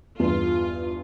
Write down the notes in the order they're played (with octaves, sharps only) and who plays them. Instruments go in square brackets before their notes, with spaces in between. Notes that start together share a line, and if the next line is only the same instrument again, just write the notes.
[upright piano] E2 G2 [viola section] F4